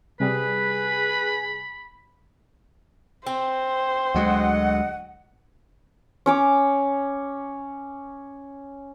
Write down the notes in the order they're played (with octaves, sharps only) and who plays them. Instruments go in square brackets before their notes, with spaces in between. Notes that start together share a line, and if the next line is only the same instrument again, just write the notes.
[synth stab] C3 G3 [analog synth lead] G#4 [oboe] B4 [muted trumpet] B5
[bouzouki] C4 [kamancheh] C5
[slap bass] D2 F#3 G#3 [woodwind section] D#5 F#5
[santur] C#4 C#5 D6